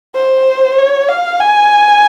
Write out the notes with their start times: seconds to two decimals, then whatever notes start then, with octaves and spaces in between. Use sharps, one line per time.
0.15 C5
0.78 C#5
1.08 F5
1.40 G#5